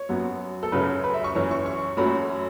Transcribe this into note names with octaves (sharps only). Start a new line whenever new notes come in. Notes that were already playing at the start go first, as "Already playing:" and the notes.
Already playing: C#5
F#2 F#3 B3
A4
F#2 C#3 F#3 C#4 B4
B4
E5
C#6
F#2 E3 C#4
C#6
C#6
F#2 F#3 A3 C#4 B5